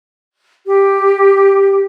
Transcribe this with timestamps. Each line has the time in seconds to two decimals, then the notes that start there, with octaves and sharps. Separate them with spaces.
0.67 G4